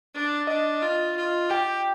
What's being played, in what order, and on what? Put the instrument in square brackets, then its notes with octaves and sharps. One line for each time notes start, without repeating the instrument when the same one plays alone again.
[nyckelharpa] D4
[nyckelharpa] D4 [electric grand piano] D#5
[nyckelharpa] F4
F4
[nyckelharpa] G4 [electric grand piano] G5